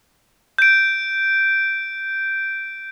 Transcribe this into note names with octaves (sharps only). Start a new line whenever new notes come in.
G6 D7